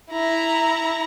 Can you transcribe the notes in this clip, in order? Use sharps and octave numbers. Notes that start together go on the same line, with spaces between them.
E4 A#5